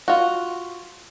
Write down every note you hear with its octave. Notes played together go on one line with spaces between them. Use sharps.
F4 F#4